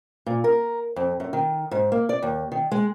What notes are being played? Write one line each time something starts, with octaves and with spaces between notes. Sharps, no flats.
A#2
A#4
F2
F#2
D#3
G#2
A#3
D5
D#2
D#3
G#3